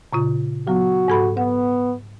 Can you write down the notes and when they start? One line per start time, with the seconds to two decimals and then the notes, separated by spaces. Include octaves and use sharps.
0.13 A#2 C#3 F4
0.67 F#3 B3 F#4
1.08 G#2 A4 B5
1.37 B3 F#5